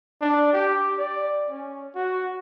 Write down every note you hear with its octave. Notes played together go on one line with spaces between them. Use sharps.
D4
G4
D5
C#4
F#4